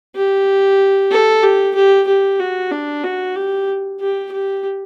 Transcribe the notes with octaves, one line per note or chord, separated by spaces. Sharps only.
G4
A4
G4
G4
G4
F#4
D4
F#4
G4
G4
G4